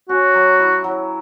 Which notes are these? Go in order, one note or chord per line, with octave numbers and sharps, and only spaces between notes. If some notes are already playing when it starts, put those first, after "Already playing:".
C#4 F#4
F#3
E4
F#3